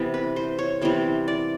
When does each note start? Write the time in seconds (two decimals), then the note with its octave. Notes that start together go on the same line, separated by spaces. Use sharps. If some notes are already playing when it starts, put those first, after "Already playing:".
Already playing: C3 E3 G3 B3
0.14 B4
0.36 C5
0.59 C#5
0.81 C3 E3 G3 B3 C5
1.28 D5